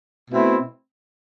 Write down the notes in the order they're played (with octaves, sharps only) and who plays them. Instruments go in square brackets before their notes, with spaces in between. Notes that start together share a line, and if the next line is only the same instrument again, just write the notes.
[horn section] B2 A3 C4 E4